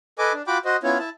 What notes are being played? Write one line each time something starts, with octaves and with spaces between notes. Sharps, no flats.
A4 B4 D#5 G#5 D6
D4
F4 F#4 G5 B5 D6
F#4 C5 D#5
B3 C#4 E4 F4 C#5
E4 A5